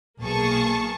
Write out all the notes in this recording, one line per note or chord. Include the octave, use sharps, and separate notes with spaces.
B1 A#3 G#4 A5 C#6